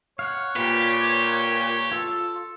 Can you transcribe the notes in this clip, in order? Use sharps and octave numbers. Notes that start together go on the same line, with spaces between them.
C#5 F5 F#5
A#2 G4 B4 F5 G5
F4 A4